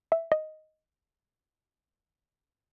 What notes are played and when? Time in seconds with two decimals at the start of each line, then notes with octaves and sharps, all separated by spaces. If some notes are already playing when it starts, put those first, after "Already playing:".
0.12 E5
0.32 D#5